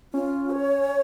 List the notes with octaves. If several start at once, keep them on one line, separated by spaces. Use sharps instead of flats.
C#4 F4
C#5